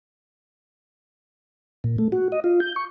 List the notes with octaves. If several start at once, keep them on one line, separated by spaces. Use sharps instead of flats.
A#2
A3
F#4
D#5
F4
G6
C#6